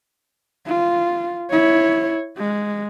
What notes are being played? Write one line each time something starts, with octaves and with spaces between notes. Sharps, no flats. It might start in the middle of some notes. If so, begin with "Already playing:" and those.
F4
E4 C#5
G#3